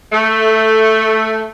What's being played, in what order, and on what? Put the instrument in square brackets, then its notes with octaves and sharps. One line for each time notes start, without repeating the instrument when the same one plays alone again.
[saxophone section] A3